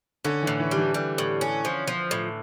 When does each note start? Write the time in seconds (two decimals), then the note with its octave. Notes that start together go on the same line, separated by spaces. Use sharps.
0.24 D3 C#4
0.42 A2 E3
0.59 E3
0.71 G3
0.77 E3
0.94 G3
1.18 A2
1.41 C#4
1.65 F3
1.87 F3
2.11 A2